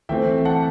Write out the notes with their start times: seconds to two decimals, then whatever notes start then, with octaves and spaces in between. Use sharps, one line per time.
0.09 E3 A3 C4 E5 G5
0.45 F#5 A5